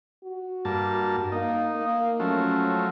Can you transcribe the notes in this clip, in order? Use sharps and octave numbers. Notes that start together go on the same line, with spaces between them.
F#4
G2 A#3 A5
A#3 D#4
A#3
F3 F#3 A3 C#4